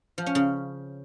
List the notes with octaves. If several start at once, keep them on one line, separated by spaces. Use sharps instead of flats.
F3
C#4
C#3